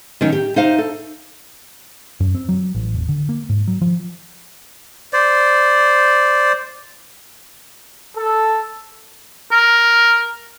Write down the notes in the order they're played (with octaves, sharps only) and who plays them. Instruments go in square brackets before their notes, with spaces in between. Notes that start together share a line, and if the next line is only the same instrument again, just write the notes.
[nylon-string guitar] D#3 F#3 C#4 D#4
G4
D#4 C5 F5
A4
[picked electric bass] F#2
C4
F#3
A1
E1
D3
A#3
G#2
F#3
F3
[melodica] C5 D5
[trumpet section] A4
[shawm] A#4